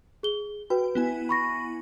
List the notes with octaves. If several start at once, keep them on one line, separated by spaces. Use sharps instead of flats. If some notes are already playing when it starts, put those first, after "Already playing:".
G#4 G7
F#4 B4 G5
B3 E4 G#5
B5 C#6 A#6